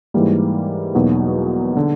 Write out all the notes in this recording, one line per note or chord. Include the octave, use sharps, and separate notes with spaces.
G#2 E3 G3 A#3
E2 B2 F#3 A#3 D#4
D3